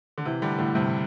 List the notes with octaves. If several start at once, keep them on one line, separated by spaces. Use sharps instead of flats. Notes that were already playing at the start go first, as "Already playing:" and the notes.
D3
C3 E3
D3 G3
A2 D3
G2 C3